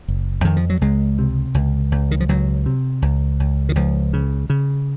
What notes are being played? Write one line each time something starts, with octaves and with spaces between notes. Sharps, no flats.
F#1
F2 D#3
F3
F#3
C#2 G#3
C3
C#2
C#2
D#3
F3
C#2 F#3
C3
C#2
C#2
D#3
C#2 F3
C#3
C#3